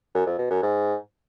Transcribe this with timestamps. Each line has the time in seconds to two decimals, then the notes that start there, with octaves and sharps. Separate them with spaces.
0.14 F#2
0.26 F2
0.38 B2
0.50 F#2
0.62 G#2